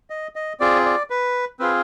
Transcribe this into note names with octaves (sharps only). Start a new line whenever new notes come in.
D#5
D#5
C4 F4 G#4 D5
D5
B4
C4 F4 G#4 B4